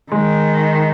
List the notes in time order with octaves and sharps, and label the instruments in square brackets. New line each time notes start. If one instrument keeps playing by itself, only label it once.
[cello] D#3 [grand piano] G#3